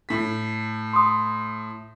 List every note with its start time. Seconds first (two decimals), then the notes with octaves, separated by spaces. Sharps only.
0.09 A2 B6
0.93 C6 D#6